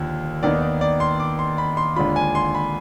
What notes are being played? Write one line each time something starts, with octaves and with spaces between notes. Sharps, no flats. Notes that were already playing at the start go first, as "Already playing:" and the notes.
Already playing: D#2 D3 F3
D#2 D#3 B3 D#4 D5
D5
D5
C6
D6
C6
B5
C6
D#2 D3 G#3 D4 F4 B5
G#5
C6
B5